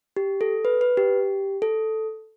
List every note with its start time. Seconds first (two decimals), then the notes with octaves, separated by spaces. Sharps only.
0.17 G4
0.41 A4
0.65 B4
0.81 B4
0.97 G4
1.62 A4